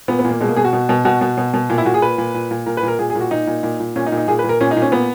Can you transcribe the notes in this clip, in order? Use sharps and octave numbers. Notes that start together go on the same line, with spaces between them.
A#2 B3
B3
A#2
A#3
B2 G#3
A#3
B2 G#4
F#4
B2
B2
B2 F#4
B2
B2
B2
A#2
E4
A#2 F#4
G#4
A#2 B4
A#2
A#2
A#2
A#2 A#4
B4
A#2
A#4
A#2 G#4
G#4
A#2
F#4
A#2 D#4
A#2
A#2
A#2
A#2 C#4
D#4
A#2
D#4
A#2 G#4
B4
A#2
A#4
A#2 C#4
D#4
A#2
C#4
A#2 B3